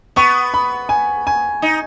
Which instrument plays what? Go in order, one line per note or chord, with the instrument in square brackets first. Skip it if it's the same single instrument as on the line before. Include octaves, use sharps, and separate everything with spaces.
[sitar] B3 [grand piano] C#6
[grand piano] B5
G#5
G#5
[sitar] D#4